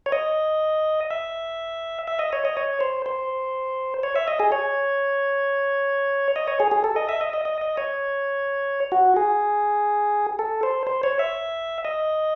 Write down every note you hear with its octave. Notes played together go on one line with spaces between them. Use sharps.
C#5
D#5
E5
E5
D#5
C#5
D#5
C#5
C5
C5
C#5
E5
D#5
G#4
C#5
D#5
C#5
G#4
G#4
A4
D#5
E5
D#5
D#5
D#5
D#5
C#5
F#4
G#4
A4
C5
C5
C#5
E5
D#5